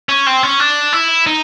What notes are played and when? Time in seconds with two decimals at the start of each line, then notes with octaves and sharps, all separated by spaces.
0.09 C#4
0.26 C4
0.43 C#4
0.60 D4
0.93 E4
1.27 D#4